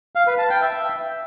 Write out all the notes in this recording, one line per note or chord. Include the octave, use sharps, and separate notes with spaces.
F5
B4
A5
G5
E5